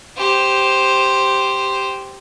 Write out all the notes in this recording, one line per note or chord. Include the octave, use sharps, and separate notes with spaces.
G4 C5